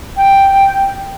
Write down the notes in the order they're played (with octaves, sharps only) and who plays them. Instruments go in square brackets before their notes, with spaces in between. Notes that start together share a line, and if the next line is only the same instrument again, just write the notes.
[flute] G5